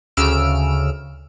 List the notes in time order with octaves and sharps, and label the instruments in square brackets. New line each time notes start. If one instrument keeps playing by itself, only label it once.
[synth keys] D2 C#3 E6 F6 D7